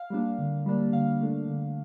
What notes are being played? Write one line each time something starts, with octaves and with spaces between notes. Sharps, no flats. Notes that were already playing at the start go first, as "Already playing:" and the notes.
Already playing: F5
G3 A#3 D4
D3
G3 A#3 D4
D3 F5
A3 D4
D3